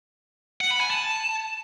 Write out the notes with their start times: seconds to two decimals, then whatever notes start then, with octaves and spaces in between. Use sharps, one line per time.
0.61 F#5
0.71 B5
0.80 G#5
0.90 A5